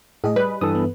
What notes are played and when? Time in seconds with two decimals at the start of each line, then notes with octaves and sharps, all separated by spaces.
0.24 A2 G#4 D#5
0.36 G3 B4
0.61 G2 E3 A4 D#6
0.75 B3